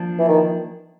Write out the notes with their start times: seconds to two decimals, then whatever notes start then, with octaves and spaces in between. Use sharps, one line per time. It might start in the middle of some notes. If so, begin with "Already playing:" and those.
Already playing: F3 A#3 D4
0.19 E3
0.28 D#3